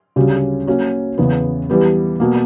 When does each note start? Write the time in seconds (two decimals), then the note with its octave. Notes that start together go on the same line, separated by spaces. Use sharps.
0.16 D2 C#3 G3 C#4 F#4
0.67 F#3 A#3 C#4 F#4
1.18 E2 C#3 E3 B3
1.70 E3 G3 B3
2.20 B2 A#3